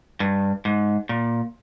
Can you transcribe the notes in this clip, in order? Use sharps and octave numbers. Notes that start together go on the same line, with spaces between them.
G2
G#2
A#2